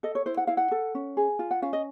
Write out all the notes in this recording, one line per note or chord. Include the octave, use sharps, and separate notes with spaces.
A4 D#5
C#5
E4 C5
F#5
E4 F5
F#5
A4
C#4
G#4
F4
F#5
C#4 F5
D#5